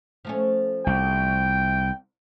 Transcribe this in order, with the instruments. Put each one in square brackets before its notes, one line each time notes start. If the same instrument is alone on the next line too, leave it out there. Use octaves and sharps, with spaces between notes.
[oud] F3 A3 C#4
[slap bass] C2 [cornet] G5